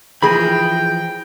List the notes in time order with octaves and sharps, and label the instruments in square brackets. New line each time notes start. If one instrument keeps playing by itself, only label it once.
[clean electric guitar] E3 F3 A#5 [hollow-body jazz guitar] G#4 B5 [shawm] G5